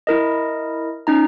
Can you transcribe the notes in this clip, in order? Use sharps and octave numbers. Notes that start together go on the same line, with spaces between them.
E4 A#4 D#5
C#4 D#4 A#5